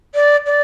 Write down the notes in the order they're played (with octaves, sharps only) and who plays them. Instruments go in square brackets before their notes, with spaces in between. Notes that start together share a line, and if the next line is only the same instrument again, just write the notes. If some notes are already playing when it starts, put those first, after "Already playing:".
[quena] D5
D5